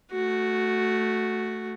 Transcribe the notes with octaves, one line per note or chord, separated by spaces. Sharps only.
A3 F#4